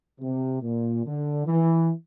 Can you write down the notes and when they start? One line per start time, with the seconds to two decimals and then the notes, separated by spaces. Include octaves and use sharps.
0.21 C3
0.62 A#2
1.05 D3
1.46 E3